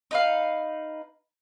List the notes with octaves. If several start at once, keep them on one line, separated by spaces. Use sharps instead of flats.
D#4 B4 F5